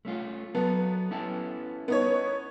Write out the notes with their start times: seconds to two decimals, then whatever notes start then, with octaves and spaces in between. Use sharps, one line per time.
0.05 A3 C#4 F4
0.55 F#3 B3 A4
1.11 C#4 E4 A4
1.88 B3 D#4 C#5